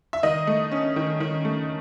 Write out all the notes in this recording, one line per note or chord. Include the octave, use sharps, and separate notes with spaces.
E5
D#3 D#5
A3
C#4
D#3
D#3
A3